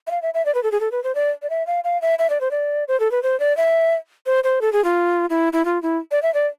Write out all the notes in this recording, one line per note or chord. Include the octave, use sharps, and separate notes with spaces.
E5
F5
E5
E5
D5
B4
A4
G#4
A4
B4
C5
D5
D5
E5
F5
F5
E5
E5
D5
C5
D5
C5
A4
B4
C5
D5
E5
C5
C5
A4
G#4
F4
E4
E4
F4
E4
D5
E5
D5